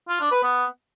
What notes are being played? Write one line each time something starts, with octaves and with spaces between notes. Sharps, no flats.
F4
D4
B4
B3